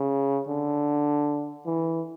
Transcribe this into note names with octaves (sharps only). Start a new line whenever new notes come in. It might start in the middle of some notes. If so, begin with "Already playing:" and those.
Already playing: C#3
D3
E3